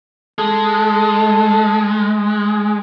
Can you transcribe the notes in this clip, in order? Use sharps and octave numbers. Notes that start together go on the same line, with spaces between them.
G#3 A4